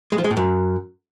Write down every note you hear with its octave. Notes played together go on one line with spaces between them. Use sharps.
G#3
F3
G#3
A2
F#2